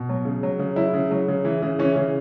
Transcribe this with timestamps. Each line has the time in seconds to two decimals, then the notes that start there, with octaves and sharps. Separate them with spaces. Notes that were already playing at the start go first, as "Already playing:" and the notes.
Already playing: B2
0.09 F#3
0.25 C#3
0.43 F#3
0.59 C#3
0.76 F#3 E4
0.94 C#3
1.11 F#3
1.28 C#3
1.45 E3
1.62 C#3
1.79 E3 C#4
1.96 C#3